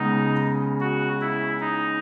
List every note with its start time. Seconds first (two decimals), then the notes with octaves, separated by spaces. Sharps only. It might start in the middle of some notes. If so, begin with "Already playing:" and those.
Already playing: C#2 C#3 G#3 B3 D#4
0.80 F#4
1.21 E4
1.60 D#4